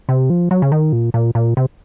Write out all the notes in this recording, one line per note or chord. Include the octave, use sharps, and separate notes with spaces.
C3
F3
F#3
C#3
D#3
A#2
A#2
A#2
C3